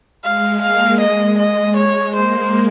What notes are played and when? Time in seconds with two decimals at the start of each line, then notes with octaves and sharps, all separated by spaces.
0.24 G#3 F5
0.62 A#3 F5
1.00 G#3 D#5
1.38 G#3 D#5
1.77 G#3 C#5
2.15 A#3 C5